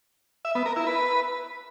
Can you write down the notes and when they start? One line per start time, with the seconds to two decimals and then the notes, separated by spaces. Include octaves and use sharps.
0.45 E5
0.55 B3
0.66 A#4
0.76 E4
0.87 B4